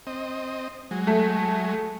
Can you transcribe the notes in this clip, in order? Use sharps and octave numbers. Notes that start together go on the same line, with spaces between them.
C4 D#5
F#3 G#3
A3